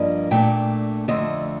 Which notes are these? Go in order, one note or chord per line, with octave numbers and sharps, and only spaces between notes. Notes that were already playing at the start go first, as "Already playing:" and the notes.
Already playing: G2 F3 A#3 D4 D#5
A#2 A3 D4 G5
F2 D3 A3 C4 D#5